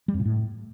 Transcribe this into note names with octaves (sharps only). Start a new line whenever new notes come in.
G3
F2
A#2
A2